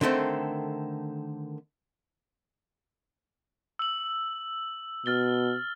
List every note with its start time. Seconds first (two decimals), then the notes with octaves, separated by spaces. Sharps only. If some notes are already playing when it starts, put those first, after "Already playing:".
0.01 D3 D#3 A3 C4
3.79 E6 F#7
5.06 B2 F6 A6 G7